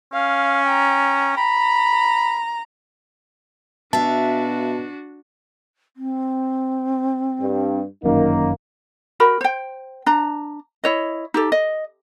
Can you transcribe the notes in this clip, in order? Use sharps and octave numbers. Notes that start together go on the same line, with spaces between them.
C#4 F5
G5 A#5
A#5 B5
B2 D4 F#4 E5 F5 A5
C4
G2
G1 F#2 D#3 A#3 D#4
F#4 A#4 B5
C5 G5
D4 A#5
E4 C#5 D#5
D#4 G4 A4
D#5